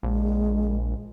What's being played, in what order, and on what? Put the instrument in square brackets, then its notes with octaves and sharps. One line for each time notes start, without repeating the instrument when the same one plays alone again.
[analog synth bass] A#1 [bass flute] G#3